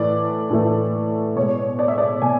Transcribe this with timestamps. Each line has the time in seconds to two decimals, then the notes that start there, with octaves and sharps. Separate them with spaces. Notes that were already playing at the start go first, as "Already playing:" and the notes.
Already playing: A2 E3 A3 D5
0.51 A2 E3 A3
1.36 B2 G#3 C#5
1.79 D5
1.88 E5
1.98 D5
2.22 B2 G#5